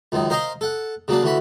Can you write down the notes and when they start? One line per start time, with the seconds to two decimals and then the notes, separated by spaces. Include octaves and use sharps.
0.12 C#2 F#2 D#3
0.30 A#4 C5 D#5 F5 A#5 C6
0.61 A4 F#5
1.08 C#3 F#3 A#3 D4
1.23 D2 E3 F#4 B5